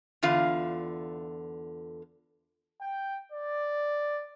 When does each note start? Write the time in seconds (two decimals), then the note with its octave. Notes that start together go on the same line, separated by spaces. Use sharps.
0.23 E2 D3 F4 F5
2.81 G5
3.32 D5